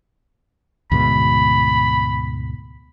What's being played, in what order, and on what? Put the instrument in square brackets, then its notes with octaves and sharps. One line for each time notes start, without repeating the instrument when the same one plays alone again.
[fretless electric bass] D2 G#2 B2 [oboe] B5